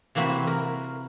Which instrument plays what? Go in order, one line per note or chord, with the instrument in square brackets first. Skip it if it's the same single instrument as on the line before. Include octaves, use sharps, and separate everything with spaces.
[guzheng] C3 E3 A#3 C4 F#4 B5
A#4